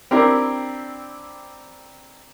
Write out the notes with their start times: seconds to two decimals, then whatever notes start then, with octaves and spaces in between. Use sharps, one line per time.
0.11 C4 D4 E4 G4 A#4